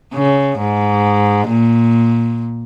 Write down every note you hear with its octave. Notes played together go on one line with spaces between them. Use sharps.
C#3
G#2
A#2